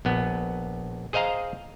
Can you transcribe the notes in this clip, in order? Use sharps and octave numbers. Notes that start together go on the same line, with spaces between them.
A#1 B3
G#4 C5 D#5 F5 A#5